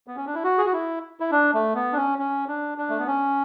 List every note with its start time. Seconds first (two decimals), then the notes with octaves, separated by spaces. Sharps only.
0.07 B3
0.16 C#4
0.26 D4
0.34 E4
0.44 F#4
0.58 G#4
0.66 F#4
0.73 E4
1.20 E4
1.31 D4
1.54 A3
1.75 B3
1.93 D4
1.97 C#4
2.19 C#4
2.48 D4
2.78 D4
2.90 A3
2.99 B3
3.07 C#4